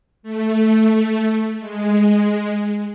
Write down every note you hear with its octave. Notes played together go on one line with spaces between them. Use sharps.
A3
G#3